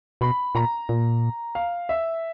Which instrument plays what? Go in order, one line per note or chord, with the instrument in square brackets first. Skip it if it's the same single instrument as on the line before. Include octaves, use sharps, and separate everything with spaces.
[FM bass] B2 [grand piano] B5
[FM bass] A#2 [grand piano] A#5
[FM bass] A#2
[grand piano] F5
E5